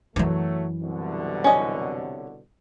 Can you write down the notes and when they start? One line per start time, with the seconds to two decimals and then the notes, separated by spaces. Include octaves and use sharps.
0.16 F#2 E3 F#3 A3
0.83 C2 B2 D3
1.44 C#4 D#5